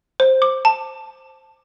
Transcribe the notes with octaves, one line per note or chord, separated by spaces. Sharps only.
C5
D6
A5